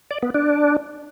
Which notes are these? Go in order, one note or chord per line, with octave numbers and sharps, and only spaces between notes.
D5
B3
D4